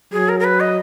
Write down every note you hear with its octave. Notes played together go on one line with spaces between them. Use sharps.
F#3 G#4
A#4
A#4
B4
D#5